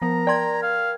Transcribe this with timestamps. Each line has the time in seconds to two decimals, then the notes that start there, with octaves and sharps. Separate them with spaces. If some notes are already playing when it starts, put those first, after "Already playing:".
0.02 F3 B3 A#4 A#5
0.27 D5 G5 A5 C6 G#6
0.62 F5